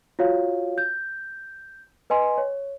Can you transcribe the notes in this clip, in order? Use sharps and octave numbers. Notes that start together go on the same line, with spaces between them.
F4 F#4 C#5 F5
G6
B4 D#5 G#5 C6
C#5